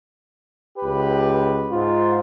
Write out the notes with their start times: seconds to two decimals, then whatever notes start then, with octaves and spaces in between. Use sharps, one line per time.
0.78 C#2 G4 B4
1.70 G#2 F4